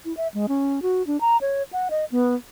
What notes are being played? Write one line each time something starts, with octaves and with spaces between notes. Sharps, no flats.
E4
E5
G#3
C#4
F#4
D4
A#5
C#5
F#5
D#5
B3